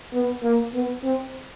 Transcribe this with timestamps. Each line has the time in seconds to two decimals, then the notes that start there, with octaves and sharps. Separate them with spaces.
0.14 B3
0.43 A#3
0.75 B3
1.04 C4